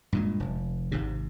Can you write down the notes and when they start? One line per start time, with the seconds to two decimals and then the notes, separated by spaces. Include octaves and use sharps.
0.13 G2 A#2 G#3
0.40 F1
0.92 G#1 G#2 C3